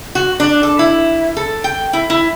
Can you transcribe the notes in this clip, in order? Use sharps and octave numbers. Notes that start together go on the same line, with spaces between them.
F#4
D4
A4
E4
A4
G5
E4
E4